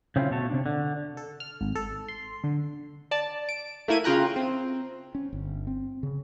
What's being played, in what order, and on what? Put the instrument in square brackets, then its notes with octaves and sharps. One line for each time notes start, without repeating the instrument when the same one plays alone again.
[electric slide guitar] C#3 C4 C#4 E4 F4
B2 A3 C#5 A5
C3 E3 D4
D3
[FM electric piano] A4
F6
G#1
A4
C6
D3
[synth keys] D5 A5
D7
A3 A#3 E4 G#6 D#7
C#3 F4 G5 A#5 F#6
C4
[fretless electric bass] C#4
G1
C4
C#3